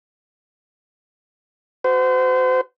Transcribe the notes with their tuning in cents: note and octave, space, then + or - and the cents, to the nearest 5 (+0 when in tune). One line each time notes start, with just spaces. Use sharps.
F#4 +0 C5 -35